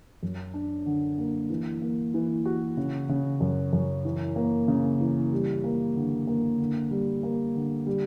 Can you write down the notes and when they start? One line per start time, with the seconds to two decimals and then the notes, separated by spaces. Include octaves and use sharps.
0.23 F#2
0.54 D4
0.86 D3
1.18 A#3
1.50 E3
1.82 A#3
2.14 E3
2.45 F#4
2.77 C#3
3.09 C#3
3.41 F#2
3.73 F#2
4.05 E3
4.36 A#3
4.68 C#3
5.01 E3
5.33 G3
5.64 A#3
5.96 D3
6.27 A#3
6.59 D3
6.91 G3
7.23 A#3
7.55 D3
7.87 G3